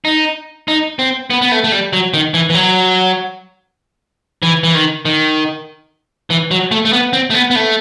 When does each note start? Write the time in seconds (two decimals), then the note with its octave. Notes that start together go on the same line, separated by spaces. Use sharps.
0.05 D#4
0.68 D#4
0.99 C4
1.30 B3
1.42 B3
1.52 A3
1.64 A3
1.72 G3
1.93 F#3
2.14 D#3
2.34 E3
2.50 E3
2.55 F#3
4.43 E3
4.63 E3
4.75 D#3
5.05 D#3
6.30 E3
6.51 F#3
6.71 A3
6.85 A3
6.93 B3
7.13 C4
7.30 A3
7.34 B3
7.51 B3
7.56 A3